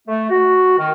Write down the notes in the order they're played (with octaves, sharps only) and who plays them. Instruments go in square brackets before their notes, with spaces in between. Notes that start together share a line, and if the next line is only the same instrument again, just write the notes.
[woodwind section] A3
F#4
D#3